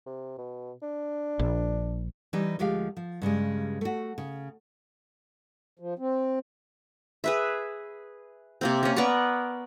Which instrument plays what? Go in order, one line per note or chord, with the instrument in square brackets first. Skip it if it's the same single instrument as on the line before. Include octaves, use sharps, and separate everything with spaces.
[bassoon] C3
B2
D4
[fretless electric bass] A#1
[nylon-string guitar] E3 G3 D#4
D2 F3 G#3 G4 F5
F3
G2 C#3 G3 G#3
A3 F#4
C#3
[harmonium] F3
C4
[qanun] G#4 B4 E5
C3 A#3 C4
A#3 C#4
B3 A#4 D5 C#6